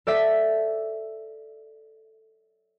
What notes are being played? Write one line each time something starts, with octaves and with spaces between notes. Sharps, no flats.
A4 D5 E5 B6